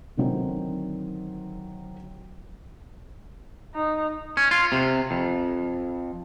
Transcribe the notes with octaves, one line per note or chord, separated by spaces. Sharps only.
D3 D#3 F#3 C4 D#4
D#4
C#4
F4
C3
F2